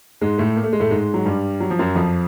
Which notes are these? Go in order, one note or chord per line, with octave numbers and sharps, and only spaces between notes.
G#2 G#3
A2 A3
A#3
A3
G#3
A2 A3
G#2 G#3
F#3
G2 G3
F#3
F3
F#2 F#3
F2 F3